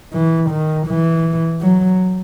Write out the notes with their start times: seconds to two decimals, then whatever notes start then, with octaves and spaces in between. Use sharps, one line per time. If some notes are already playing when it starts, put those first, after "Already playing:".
0.13 E3
0.50 D#3
0.87 E3
1.61 F#3